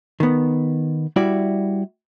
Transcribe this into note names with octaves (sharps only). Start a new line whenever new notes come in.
D#3 B3
G3 E4 F#4 D5